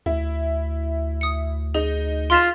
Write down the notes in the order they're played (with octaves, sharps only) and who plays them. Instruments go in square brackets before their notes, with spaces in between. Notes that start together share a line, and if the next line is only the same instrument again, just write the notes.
[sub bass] D2 [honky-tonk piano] E4
[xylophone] D#6 C#7
[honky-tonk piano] D#4 [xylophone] G#4
[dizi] F4 [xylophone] C6 B6 E7